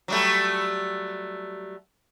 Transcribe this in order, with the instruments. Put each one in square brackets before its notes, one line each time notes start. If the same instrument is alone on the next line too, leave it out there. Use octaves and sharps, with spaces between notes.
[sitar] F#3 G3 A3